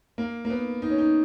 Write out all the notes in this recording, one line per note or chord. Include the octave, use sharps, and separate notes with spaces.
A#3
A#3
B3
D#4
C#4
D#4